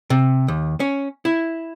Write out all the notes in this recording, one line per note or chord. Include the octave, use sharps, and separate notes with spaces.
C3
D#2
C#4
E4